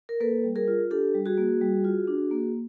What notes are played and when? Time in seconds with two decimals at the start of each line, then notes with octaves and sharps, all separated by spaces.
0.09 A#4
0.20 A#3 A4 B4
0.44 G3
0.56 G#4 A#4
0.68 F4
0.91 D4 G4 A4
1.14 G3
1.26 F#4 G#4
1.38 A#3
1.61 G3
1.85 F4
2.08 D4
2.31 A#3